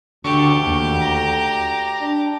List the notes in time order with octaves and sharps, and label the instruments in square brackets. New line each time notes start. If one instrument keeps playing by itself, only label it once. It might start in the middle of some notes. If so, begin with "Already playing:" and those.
[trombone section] D2 [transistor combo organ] D3 C#6 [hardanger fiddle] G4
[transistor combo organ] D#2
A#5
[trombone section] D4